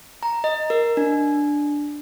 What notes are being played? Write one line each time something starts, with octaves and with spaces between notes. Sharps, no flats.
A#5
D#5
A#4
D4